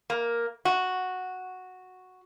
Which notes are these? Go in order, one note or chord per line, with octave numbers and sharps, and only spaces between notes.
A#3
F#4